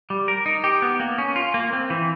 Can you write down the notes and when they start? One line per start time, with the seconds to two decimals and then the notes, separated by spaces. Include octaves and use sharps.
0.10 G3
0.28 A#4
0.46 D#4
0.64 G4
0.82 B3
1.00 A#3
1.18 C#4
1.36 F4
1.54 A#3
1.73 C4
1.90 E3